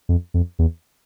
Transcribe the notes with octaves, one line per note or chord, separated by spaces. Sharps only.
F2
F2
E2